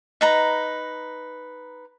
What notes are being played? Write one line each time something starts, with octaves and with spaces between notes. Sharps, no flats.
D#4 B4 A#5